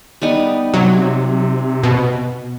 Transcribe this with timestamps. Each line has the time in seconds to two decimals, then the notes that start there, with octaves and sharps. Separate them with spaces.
0.22 G3 B3 D#4
0.74 C3 F#3
1.84 B2